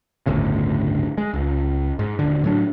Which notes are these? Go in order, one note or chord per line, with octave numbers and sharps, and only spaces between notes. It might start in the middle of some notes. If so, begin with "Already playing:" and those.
G1 D2 A2 C#3
G#3
C#2
G#2
D#1 D3
A2 F#3 D4